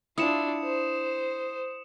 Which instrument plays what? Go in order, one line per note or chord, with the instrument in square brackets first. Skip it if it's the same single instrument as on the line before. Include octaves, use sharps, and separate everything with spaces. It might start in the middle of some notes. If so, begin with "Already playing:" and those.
[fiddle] D4 F4 [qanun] E4 [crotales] D#6 C#7 E7
[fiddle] C5